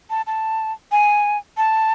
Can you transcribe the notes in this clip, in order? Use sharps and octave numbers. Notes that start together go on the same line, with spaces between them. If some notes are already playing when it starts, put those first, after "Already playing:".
A5
A5
G#5
A5